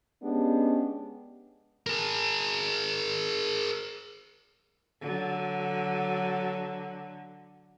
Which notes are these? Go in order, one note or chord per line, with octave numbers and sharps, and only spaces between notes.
G#3 B3 C#4 D4 G4
G#4 A#4
D3 F#3